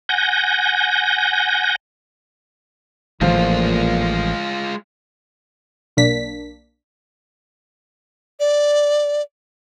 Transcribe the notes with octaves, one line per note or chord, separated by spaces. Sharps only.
F#5 G#5 G6 A#6
A1 A#2 F3 G#3 F4
B1 A#3 D4 B6
D5